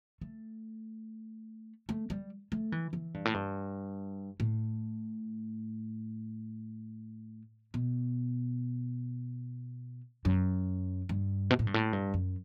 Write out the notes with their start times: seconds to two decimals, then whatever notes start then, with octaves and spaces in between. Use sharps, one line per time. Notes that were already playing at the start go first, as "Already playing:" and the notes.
0.21 A3
1.89 A3
2.10 G3
2.52 A3
2.72 E3
2.93 E3
3.14 G2
3.25 A2
3.34 G2
4.40 A2
7.74 B2
10.25 F#2
11.09 G2
11.50 B2
11.59 A2
11.67 G2
11.74 A2
11.93 G2
12.14 F#2